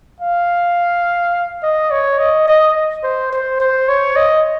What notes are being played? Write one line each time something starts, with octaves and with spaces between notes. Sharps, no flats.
F5
D#5
C#5
D#5
D#5
C5
C5
C5
C#5
D#5